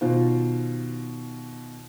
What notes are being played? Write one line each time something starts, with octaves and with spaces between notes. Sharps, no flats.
B2 D#3 F4 C5